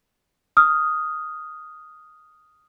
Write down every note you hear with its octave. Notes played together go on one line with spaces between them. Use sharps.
D#6 F6